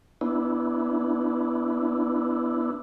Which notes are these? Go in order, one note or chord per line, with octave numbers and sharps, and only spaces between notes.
B3 D4 E4